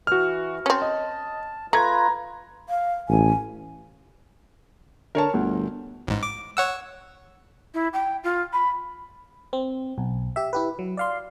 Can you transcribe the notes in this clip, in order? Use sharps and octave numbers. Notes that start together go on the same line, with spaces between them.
E3 F#4 F6
C4 C#4 A5
D#5
A3 F4 B4 A#5 G#6
F5
A1 G#5
D3 A#4 C#5 A5
G1 D2
A1 G#2
D6
C#5 F#5 E6
E4
G5
F4
B5
C4
B1
G4 E5
E4 G4 B4
F#3
D5 F5 C6